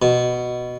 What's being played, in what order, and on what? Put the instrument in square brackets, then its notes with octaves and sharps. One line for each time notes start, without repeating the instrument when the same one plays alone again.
[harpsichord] B2